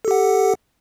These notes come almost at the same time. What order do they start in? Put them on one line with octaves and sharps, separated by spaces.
A4 G4 F#5